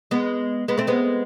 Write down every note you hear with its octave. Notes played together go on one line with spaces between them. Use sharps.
G#3 B3
G#3 B3
A3 C4
G#3 B3